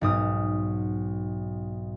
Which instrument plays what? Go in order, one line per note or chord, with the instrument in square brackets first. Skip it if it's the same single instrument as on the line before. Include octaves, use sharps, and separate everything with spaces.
[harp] B1 G#2 D#6 F6